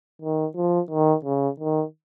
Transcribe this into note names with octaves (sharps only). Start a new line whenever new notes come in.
D#3
F3
D#3
C#3
D#3